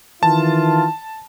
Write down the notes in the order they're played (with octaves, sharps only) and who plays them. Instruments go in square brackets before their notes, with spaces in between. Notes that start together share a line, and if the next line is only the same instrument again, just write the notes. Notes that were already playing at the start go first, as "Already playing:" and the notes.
[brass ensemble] D#3 E3 F4 [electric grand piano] A5